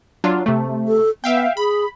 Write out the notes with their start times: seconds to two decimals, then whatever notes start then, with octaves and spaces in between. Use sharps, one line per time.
0.24 F#3 D4 F4
0.46 C3 A3
0.88 A4
1.24 B3 E5 F5 G5
1.57 G#4 B5